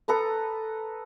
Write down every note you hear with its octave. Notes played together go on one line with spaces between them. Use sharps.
A4 B4 A#5 D#6